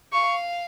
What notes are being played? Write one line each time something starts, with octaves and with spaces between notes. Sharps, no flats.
F5 C#6